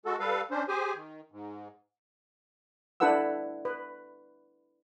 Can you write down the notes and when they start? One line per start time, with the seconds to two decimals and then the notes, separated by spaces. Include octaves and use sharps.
0.06 G#3 F#4 A4
0.20 G3 A4 B4 F5
0.51 C#4 D4 C5
0.68 G4 G#4 C5 G#5
0.95 D#3
1.32 G#2
3.00 D4 E4 A4 B4 F#5 E6
3.65 B4